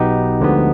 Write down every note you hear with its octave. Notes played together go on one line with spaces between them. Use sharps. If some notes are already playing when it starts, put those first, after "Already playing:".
Already playing: B1 B2 B3 D#4 G4
D2 D3 F3 G#3 B3